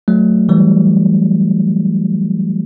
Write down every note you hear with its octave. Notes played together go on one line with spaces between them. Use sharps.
F#3 A3
E3 G3